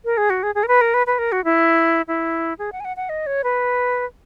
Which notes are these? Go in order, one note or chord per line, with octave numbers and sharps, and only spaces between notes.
A#4
G#4
F#4
G#4
G#4
A#4
B4
A#4
B4
B4
A#4
F#4
E4
E4
G#4
F#5
G#5
F#5
F#5
D#5
C#5
B4